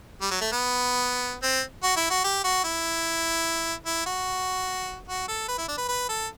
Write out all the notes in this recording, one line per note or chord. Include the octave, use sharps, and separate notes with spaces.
G3
F#3
A3
B3
C4
F#4
E4
F#4
G4
F#4
E4
E4
F#4
F#4
A4
B4
E4
D4
B4
B4
A4